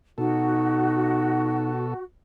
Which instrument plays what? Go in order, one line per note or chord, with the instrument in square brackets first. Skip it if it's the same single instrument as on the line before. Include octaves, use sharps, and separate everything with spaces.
[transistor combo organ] B2 A4 [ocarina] D#4 [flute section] F#4